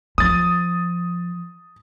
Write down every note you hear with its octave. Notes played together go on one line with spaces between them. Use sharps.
F3 D#6 A6